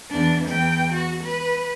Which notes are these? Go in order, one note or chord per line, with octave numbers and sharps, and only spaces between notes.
E2 D4
E2 G5
F#4
B4